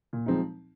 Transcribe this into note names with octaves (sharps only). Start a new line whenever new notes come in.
A#2
F3 G#3 C4 D#4